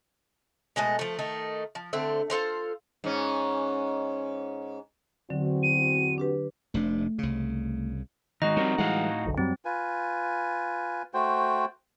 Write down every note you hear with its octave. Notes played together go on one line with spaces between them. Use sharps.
B2 G#3 A3 D#5
F3 A3
D#3 A3 D#4
F3
D3 A3 C4
F4 A4 C5 F5
G#2 C#4
E2 D3 F#3 C4 F#4
D#7
D4 G4 B4
F1 C3 A3 D4
C2 C#3
D#3 G#3 D#4 F#4 D#5
G3 C4 A#4 C#5
A2 E3 G3 G#3 F5 F#5
F#1 B1 D3
F#2 F#3 G3 C4
F4 B4 G#5
A3 F#4 C5 G5